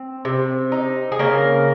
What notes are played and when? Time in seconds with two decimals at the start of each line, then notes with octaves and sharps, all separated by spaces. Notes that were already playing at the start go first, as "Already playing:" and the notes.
Already playing: C4
0.25 C3
0.72 D#4
1.12 G#4
1.19 C#3 A#3 A#4